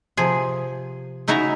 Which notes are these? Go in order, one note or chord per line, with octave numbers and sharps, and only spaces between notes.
C3 F3 G#4
C#3 D#4 E4 F#4 E5 A#5